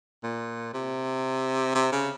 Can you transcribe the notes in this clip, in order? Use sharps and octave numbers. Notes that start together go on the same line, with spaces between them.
A#2
C3
C3
C#3